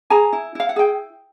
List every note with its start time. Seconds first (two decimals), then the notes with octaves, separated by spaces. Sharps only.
0.10 G#4 G#5 A#5
0.33 E4
0.55 E4 F5
0.69 F#5
0.76 G#4 G5